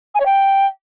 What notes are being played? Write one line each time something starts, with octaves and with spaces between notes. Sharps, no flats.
G#5
C#5
G5